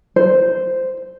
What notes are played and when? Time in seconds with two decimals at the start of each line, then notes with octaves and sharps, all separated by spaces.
0.16 C5